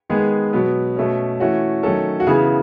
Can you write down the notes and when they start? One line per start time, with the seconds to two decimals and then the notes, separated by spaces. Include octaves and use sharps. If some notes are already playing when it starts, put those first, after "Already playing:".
0.09 D#3 G#3 B3 G#4
0.53 B2 F#3 B3
0.96 B2 A3 C#4
1.40 E3 A3 C#4 F#4
1.83 D#3 F#3 A3 C#4 A4
2.20 F#4
2.27 C#3 E3 B3 G#4